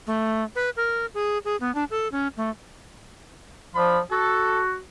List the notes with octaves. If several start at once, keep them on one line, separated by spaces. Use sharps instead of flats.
A3
B4
A#4
G#4
G#4
B3
D4
A4
C#4
A3
F3 D4 F4 B5
F#4 A4